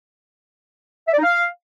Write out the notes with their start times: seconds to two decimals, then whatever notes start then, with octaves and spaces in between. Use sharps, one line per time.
1.08 E5
1.13 D5
1.18 D#4
1.24 F5